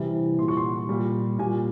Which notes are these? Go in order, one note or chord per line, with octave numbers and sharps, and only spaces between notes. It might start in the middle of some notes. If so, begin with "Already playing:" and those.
Already playing: C3 E3 G3
A#2 G3 C6
C#6
C6
A#2 G3
A#2 G3 G#5